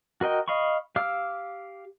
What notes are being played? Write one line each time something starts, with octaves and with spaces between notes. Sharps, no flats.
F#4 A#4 D#5 G5
D#5 F5 B5 C#6
G4 F5 D6 E6 F6